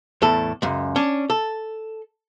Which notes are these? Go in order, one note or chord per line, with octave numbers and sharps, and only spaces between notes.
E2 A2 A4
C#2 F#2
C#4 D4
A4